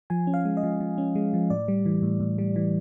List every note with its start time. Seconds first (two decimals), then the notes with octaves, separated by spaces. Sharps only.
0.10 F3 G#5
0.27 C#4
0.34 F5
0.45 G#3
0.57 D#5
0.63 F3
0.80 F3
0.98 C#4
1.15 G#3
1.34 F3
1.50 A2 D5
1.68 G3
1.86 E3
2.03 A2
2.20 A2
2.38 G3
2.56 E3